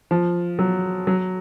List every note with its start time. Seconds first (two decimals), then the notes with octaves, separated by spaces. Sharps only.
0.11 F3
0.59 F#3
1.07 F#3